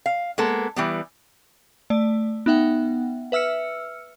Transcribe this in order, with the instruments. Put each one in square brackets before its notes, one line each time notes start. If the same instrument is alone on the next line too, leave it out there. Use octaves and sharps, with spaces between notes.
[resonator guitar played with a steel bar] F5
G#3 A#3 B3 A4
E3 G3 B3
[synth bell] A3 D5
B3 D#4 E5 F#5 G5
B4 E5 E6 F6 C#7